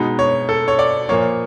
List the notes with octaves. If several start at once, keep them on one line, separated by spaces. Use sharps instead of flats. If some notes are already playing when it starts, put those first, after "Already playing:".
Already playing: B2 G#3 B3 D#4
C#5
A4
C#5
D5
A#2 F3 A#3 C#5